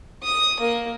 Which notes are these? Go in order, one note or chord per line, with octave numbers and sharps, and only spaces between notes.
D#6
A#3